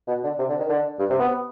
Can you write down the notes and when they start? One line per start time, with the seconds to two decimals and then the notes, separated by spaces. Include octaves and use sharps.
0.07 B2
0.24 D3
0.39 C3
0.49 D3
0.59 D#3
0.69 D3
0.99 G2
1.10 C3
1.19 B3